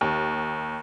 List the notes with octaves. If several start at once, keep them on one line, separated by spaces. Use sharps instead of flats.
D#2